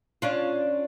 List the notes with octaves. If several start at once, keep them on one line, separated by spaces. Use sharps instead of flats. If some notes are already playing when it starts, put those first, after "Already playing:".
C#4 D4 F4